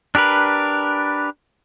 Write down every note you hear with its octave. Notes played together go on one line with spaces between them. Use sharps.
D4 G4 A#4 B4